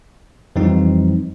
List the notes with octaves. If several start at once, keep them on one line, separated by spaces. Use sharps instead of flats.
F2 E3 F3 G3 C4 D#4